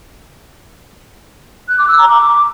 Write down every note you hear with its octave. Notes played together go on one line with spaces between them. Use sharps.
F#6
D6
E6
A#5
D6